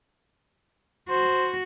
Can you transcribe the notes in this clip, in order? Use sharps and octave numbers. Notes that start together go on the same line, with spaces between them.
F#4 C5